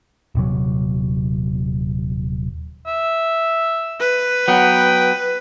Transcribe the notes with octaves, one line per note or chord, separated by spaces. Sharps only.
D#1 C3 F#3
E5
B4
F#3 B3 G5